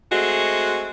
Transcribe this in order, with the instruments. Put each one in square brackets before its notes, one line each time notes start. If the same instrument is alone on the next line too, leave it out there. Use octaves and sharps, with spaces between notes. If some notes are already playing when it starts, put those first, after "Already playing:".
[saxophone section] G#3 A3 C4 F#4